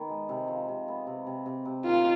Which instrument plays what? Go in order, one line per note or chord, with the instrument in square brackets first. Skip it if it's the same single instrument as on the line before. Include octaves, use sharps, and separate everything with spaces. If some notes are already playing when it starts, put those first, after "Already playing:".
Already playing: [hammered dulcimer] D#3 B3
G#3
C3
F3
C3
B3
C3
C3
C3
C3
[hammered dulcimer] D#3 [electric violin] F4